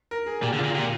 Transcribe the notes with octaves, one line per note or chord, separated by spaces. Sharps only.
A#4
G#4
A#2 G4
D3
F4
A#2
F4
A#2 G4